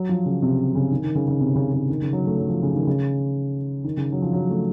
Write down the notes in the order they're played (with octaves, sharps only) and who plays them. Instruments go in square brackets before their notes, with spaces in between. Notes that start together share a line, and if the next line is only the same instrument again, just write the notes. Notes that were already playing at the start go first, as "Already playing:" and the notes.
Already playing: [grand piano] F#3
F3
C#3
C3
C#3
D#3
D#3
C#3
C#3
C3
C#3
C#3
D#3
C#3
F#3
A3
F#3
F3
C#3
D#3
C#3
D#3
C#3
F#3
F3
F#3
A3